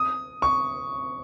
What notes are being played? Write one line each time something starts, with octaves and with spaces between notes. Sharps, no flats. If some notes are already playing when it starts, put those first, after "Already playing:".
Already playing: D#6
C#6